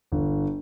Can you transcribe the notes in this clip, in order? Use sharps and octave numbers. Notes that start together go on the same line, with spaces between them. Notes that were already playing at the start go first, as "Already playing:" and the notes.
G1